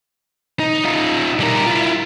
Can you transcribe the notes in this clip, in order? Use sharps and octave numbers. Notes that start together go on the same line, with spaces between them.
D#4
D#4 F4
G3 A#4
E4 F4